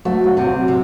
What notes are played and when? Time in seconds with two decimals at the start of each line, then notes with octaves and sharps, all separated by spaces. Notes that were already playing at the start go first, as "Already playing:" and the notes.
0.05 F#3 A3 F#4
0.26 F#3 F#4
0.37 C3
0.47 F#3 F#4
0.68 C3